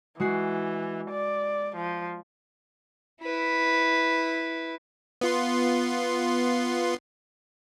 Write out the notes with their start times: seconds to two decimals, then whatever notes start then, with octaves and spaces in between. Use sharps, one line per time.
0.20 E3 G#3 F#4 C7
1.10 D5
1.76 F3
3.22 E4 B4
5.21 B3 F4 C6